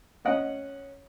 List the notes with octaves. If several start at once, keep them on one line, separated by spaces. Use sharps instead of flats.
C#4 D#5 F#5